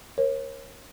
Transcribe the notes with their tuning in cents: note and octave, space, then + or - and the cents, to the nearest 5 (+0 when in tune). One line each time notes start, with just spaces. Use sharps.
A#4 +15 C#5 -30